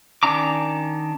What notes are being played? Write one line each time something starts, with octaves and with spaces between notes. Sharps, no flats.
D#3 C#4 D4 A#5 D6